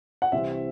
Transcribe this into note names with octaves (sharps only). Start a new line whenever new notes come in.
F#5
C2 C3 E3 C4 E5